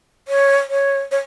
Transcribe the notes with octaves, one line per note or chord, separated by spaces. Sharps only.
C#5
C#5
C#5